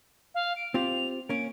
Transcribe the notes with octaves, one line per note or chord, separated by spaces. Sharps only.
F5
D7
C4 F4 G4 F7
A#3 C#4 D7